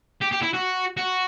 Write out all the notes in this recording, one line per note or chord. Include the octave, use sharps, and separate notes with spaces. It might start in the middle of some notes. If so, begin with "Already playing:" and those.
G4
G4
E4
F#4
F#4